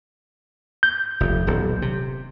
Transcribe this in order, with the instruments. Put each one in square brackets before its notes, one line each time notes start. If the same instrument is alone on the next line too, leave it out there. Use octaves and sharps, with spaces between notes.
[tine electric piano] G6
[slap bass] F1 D#2
D#1 B1
C3